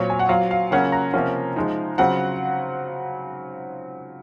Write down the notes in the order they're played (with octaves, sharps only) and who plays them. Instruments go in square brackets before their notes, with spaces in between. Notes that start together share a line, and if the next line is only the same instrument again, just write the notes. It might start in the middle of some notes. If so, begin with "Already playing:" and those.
Already playing: [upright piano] A#2 F#3 C4 F4 C#5
G#5
F#5
F#3 C4 F4 F5
F5
C#3 F#3 A#3 C#4 F4 F#5
A#5
C3 F3 A#3 C#4
F3 G#3 D#4
C#3 F#3 C4 F4 F#5